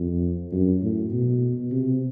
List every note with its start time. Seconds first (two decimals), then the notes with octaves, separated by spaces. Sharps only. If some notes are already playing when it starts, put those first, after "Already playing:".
Already playing: F2
0.52 F#2
0.83 A2
1.12 B2
1.72 C3